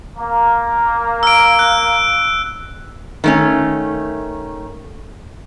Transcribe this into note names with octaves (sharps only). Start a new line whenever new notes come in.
A#3
E6 D7
F#6
D#3 A3 C#4